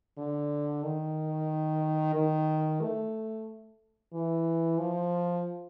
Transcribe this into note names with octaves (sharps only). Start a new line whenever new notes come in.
D3
D#3
D#3
A3
E3
F3